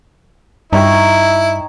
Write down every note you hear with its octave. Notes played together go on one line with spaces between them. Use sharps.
G2 D#4 E4 C#5 G5